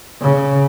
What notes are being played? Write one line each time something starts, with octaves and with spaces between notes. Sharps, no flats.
C#3